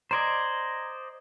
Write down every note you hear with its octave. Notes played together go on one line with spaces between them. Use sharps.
C5 D5 D#5 A#5 C6 G#6